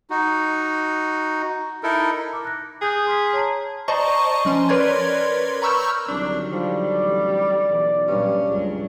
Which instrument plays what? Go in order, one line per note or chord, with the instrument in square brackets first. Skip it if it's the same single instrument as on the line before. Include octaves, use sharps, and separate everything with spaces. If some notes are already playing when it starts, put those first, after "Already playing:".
[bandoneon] D#4 F#4
D#4 E4 A4 A#4
[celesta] D6
F#6 A#6
[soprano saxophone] G#4 [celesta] D#6 G6
[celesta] C6 F6 B6
C#5 A5 A#5
[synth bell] C5 D5 D#5 A5 A#5 C#6
F3 C#4 C6
A#4 B4 C#5 D5 C6 G#6
A#5 B5 C#6 E6 F6 G6
[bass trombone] C2 [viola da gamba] D3 D#3 F#3 [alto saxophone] D4
[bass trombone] F3 [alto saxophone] G3 [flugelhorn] D5
[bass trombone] A1
[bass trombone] B1 [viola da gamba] E3
[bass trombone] G2 [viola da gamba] A#2 F#3 [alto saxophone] C#4
[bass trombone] C#2 [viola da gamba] G2 F#3 D4